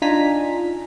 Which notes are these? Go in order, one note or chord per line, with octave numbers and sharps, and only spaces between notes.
D4 D#4 F4 G#5 A#5 B6